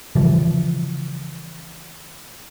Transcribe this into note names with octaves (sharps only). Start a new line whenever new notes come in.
C#3 E3 F3 G3